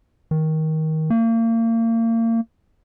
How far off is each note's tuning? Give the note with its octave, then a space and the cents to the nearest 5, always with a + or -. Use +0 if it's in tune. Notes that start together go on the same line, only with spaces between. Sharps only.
D#3 +20
A#3 -35